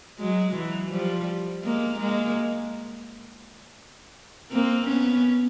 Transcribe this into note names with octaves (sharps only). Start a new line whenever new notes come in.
F#3 G#3
E3 F#3
F3 G3
G#3 A#3
G#3 A#3
A#3 C4
B3 C#4